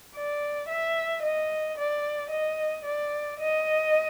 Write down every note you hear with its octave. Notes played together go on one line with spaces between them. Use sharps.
D5
E5
D#5
D5
D#5
D5
D#5